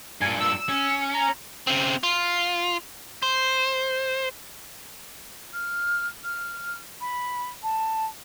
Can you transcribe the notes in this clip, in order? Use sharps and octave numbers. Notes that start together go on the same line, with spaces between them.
G2 A#2 G#5
E6
C#4
A#5
C#3 C4
F4
C5
F6
F6
B5
A5